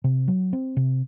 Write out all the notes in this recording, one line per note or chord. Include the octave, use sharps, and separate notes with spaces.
C3
F#3
C4
C3